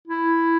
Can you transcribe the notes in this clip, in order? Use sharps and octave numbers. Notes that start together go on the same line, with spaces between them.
E4